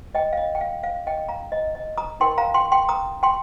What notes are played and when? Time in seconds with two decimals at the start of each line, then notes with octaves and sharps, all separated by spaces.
0.15 D#5 G5
0.33 F5
0.37 D#5
0.55 G5
0.61 F5
0.83 F5
1.07 D#5 G5
1.29 F5 A#5
1.52 D#5
1.75 D#5
1.98 A#5 D#6
2.20 D#4 A#4 G5 C6
2.38 F5 A#5
2.54 G5 C6
2.72 G5 C6
2.88 A#5 D#6
3.23 G5 C6